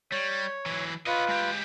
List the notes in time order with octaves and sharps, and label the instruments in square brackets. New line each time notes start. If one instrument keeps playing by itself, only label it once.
[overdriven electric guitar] G3 [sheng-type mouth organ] C#5
[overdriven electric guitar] E3 F#3
[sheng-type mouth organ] F4 B4 [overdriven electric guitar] C#5 D#5
[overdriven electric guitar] G#3 G4